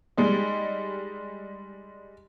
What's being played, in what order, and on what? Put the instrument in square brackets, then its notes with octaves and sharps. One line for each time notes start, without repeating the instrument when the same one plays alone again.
[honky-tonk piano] G3 G#3 D#4